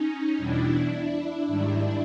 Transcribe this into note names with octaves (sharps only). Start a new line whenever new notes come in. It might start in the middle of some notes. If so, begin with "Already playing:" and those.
Already playing: C#4 D#4
E2 B2 G3 D4 E4
G#2 D#3 G3